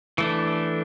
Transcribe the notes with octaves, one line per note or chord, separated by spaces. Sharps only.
E3 A3 D4